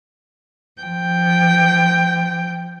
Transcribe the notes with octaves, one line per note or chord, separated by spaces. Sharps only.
F3 G5